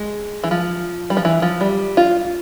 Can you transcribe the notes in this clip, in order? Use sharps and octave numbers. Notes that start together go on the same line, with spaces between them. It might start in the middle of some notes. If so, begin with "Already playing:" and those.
Already playing: G#3
E3
F3
G3
F3
E3
F3
G3
F4